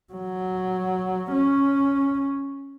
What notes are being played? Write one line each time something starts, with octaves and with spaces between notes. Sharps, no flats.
F#3
C#4